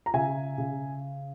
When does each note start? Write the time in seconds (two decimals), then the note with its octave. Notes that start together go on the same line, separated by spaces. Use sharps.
0.06 A#5
0.14 C#3 E5 G#5
0.58 C#3